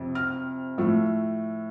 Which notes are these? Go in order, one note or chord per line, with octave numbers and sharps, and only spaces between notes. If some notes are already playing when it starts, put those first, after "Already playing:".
Already playing: F2 C3
F6
A2 F3 A3